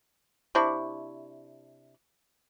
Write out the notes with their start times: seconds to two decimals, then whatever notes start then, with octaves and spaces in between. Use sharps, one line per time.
0.55 C3 D4 E4 C#6